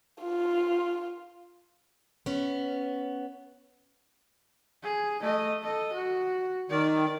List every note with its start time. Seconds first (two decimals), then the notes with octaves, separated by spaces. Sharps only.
0.22 F4
2.26 B3 C#4
4.83 G#4
5.21 A3 D#5
5.62 A4 D#5
5.93 F#4
6.70 D#3 D5